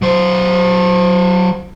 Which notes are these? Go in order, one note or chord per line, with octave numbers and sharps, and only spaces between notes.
F#3 C5